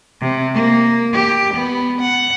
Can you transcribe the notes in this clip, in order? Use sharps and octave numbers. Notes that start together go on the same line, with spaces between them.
C3
A#3
G4
B3
F#5